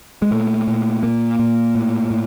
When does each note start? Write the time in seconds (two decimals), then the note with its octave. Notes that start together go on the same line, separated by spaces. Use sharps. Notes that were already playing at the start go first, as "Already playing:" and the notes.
0.22 G#3
0.31 A#2 A3
0.68 A#2
1.03 A#2 A#3
1.39 A#2
1.75 A2
2.11 A2